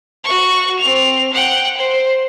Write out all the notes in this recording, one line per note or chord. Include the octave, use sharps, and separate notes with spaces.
F#4 C#6
C4 F7
F#5 G5
C5